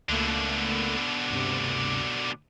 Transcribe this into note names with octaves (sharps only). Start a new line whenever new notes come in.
C#2 B2 D3 A3 A#3
D2 G2 C3